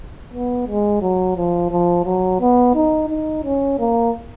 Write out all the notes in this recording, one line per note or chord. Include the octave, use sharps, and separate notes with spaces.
B3
G#3
F#3
F3
F3
F#3
B3
D#4
D#4
C#4
A#3